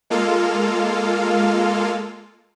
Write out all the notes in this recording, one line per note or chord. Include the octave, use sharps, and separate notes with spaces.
G#3 A#3 F4 A4 F5